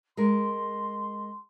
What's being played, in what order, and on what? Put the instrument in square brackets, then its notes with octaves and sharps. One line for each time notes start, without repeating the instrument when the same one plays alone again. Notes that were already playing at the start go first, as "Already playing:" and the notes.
[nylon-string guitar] G#3 A#4 [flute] C6